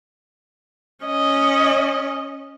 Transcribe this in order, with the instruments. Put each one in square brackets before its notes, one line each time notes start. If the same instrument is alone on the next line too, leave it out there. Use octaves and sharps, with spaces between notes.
[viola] C#4 D#5